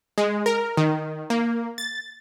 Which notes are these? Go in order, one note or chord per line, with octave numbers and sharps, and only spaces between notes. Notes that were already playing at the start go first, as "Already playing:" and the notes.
G#3
A#4
D#3
A#3
A6